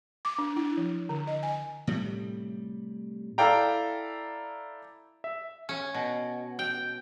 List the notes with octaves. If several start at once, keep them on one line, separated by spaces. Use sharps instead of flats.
D6
D4
E4
F3
D3
D#5
G#5
A2 C3 G3
E4 A4 D5 F5 G5 A#5
E5
C#4
B2
G5